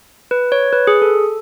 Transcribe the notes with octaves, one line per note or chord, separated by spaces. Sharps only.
B4
C#5
B4
G#4
A4